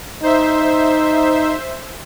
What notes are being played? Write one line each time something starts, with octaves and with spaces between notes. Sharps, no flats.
D#4 C5 E5